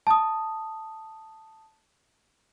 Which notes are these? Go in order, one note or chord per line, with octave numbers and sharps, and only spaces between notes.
A5 D#6